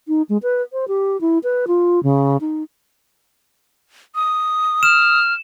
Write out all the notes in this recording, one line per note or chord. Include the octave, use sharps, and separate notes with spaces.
D#4
G#3
B4
C5
G4
E4
B4
F4
C#3
D#4
D#6
F6 E7